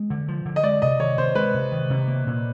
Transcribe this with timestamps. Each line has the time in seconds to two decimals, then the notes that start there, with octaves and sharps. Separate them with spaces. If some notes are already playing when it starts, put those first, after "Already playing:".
Already playing: G#3
0.10 D3
0.28 F3
0.46 D3
0.56 D#5
0.63 G#3 D5
0.82 C3 D#5
1.00 D#3 C#5
1.18 C3 C5
1.35 G#3 B4
1.54 C3
1.72 D#3
1.90 C3
2.07 A#3
2.27 A#2